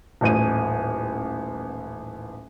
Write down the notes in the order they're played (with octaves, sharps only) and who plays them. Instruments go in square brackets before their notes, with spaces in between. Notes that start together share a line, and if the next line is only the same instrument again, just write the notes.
[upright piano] D#1 A1 D#7